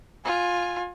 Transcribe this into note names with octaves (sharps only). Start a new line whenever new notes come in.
F4 G#5